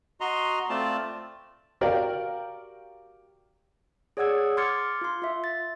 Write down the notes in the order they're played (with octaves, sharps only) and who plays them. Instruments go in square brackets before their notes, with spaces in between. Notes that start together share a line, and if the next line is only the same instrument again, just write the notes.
[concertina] F#4 D#5 A#5 C6
A3 C4 F4 D5 A5
[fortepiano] F#4 G4 A#4 D5 F5 G5
[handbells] G#4 C#5 D5 F#5 E6 G#6
C6 D6 F6 G#6 A6 C#7
F4 C6
F4 E5
A6